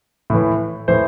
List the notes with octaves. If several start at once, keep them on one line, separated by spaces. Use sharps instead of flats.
A2 E3
A2 E3 C5